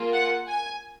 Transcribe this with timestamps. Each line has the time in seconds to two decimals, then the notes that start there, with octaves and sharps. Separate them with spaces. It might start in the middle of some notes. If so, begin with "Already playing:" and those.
Already playing: A#3 F4 G#4
0.13 F#5
0.48 G#5